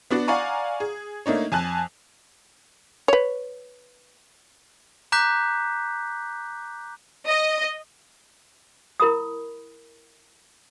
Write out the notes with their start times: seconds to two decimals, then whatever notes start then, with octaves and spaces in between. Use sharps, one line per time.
0.11 B3 D4 F#4 D5
0.28 D5 F5 F#5 G#5 A#5 C#6
0.80 G#4
1.26 A3 A#3 D4 D#4 C#5
1.52 F2 G#5 A5 F#6
3.08 B4 C#5
5.12 A#5 D6 F#6 G6 B6
7.25 D#5
9.00 E4 A#4 B5 D#6